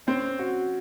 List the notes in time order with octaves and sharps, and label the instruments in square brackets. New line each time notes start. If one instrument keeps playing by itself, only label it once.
[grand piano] C4 [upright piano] C#4
[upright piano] F#4